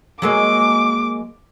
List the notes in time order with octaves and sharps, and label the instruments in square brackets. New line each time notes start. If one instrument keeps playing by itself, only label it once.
[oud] F#3 G#3 A#3 [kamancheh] D6